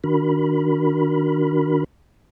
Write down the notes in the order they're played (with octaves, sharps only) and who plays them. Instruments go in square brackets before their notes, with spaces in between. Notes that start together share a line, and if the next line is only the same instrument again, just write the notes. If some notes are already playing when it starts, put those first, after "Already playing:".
[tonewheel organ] D#3 D4 F#4 A#4 B5